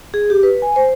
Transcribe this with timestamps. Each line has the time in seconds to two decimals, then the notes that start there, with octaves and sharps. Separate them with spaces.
0.14 G#4
0.30 G4
0.43 B4
0.62 G#5
0.76 C5